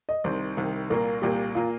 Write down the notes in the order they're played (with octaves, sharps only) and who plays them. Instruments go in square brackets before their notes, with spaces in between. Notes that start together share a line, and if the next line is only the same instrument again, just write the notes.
[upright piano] D#5
[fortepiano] C2 C3 D#3 [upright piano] C5
[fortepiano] C2 C3 D#3
[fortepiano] C2 A#2 A#3 [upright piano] A#4
[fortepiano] C2 A#2 A#3 [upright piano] G4
[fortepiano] A#2 A#3 [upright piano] F4